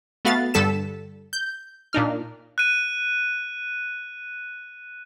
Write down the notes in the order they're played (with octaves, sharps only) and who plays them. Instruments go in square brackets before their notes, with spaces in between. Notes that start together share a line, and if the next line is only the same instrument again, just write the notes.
[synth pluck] A3 B3 F#4 F5 A6
G2 D3 G3 A4 B6 E7
G6
A#2 D4 D#4 F6
[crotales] F#6 D#7